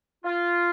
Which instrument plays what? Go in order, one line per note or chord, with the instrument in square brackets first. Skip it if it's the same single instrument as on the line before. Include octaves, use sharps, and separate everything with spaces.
[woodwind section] F4